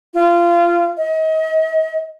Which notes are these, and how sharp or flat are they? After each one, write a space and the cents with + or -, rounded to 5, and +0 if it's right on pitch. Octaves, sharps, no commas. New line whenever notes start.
F4 -20
D#5 +35